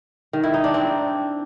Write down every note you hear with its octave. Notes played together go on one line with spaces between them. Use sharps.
D#3
E4
D#4
D4
C4